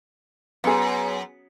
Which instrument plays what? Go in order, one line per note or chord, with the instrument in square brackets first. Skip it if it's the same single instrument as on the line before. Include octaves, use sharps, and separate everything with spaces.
[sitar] F#2 [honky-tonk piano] B3 G#4